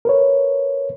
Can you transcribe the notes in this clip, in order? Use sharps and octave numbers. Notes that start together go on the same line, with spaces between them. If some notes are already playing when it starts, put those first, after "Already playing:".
A#4 B4 C#5